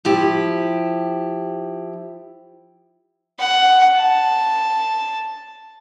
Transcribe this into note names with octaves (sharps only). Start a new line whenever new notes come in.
F3 E4 G4
F#5
A5